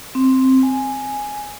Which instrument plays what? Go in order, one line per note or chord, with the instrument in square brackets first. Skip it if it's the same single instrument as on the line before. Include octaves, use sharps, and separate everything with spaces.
[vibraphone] C4
G#5